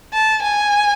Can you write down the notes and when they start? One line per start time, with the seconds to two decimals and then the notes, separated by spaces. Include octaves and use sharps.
0.13 A5
0.43 G#5